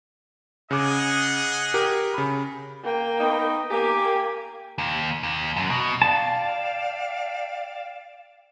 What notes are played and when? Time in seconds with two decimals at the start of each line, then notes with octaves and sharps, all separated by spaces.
0.71 C#3 G#4 D#5 F#5 D6
1.74 G4 A#4
2.14 C#3 B5
2.84 A#3 G5
3.19 B3 D#4
3.71 A#3 G4 G#5
4.78 D#2
5.23 D#2
5.57 F#2
5.70 B2
6.02 D5 F5 G5 A5